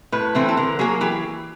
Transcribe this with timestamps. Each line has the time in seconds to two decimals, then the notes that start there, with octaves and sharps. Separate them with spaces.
0.12 A2 B4
0.35 E3 A3 C4
0.48 A4
0.57 D3 A#4
0.79 F#3 A#3 G#4
1.01 E3 G4